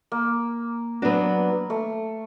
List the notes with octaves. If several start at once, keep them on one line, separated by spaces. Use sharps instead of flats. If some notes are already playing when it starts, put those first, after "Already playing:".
A#3
F#3 B3 D4 F#4
A3